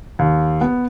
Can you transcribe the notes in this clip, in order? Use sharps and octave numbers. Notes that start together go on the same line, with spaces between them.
D#2
B3